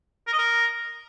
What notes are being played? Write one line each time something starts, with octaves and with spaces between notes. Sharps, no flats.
A#4
D#5
A#4